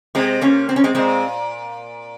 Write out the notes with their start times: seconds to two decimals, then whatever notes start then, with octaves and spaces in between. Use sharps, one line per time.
0.15 C3 G#3 C4
0.41 A#3 C#4
0.69 C4
0.76 C#4
0.84 G#3 C4
0.95 A#2 G#3 C4